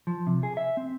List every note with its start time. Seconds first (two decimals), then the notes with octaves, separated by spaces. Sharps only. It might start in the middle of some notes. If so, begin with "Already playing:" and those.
0.07 F3
0.27 C3
0.43 G#4
0.57 E5
0.77 C4